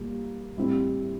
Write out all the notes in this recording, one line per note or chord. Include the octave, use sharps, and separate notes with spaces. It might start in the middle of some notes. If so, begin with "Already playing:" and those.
Already playing: A#2 G3 A#3
A2 G3 C4